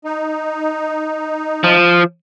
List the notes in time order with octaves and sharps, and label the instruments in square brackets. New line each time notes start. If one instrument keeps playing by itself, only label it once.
[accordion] D#4
[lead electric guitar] F3